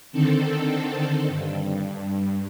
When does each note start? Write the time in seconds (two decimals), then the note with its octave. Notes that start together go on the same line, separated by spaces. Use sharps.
0.12 D3 D#3 C4 A4
1.28 G2